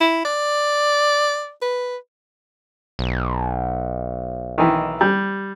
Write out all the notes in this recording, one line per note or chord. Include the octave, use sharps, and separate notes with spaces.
E4
D5
B4
B1
D#3 E3
G3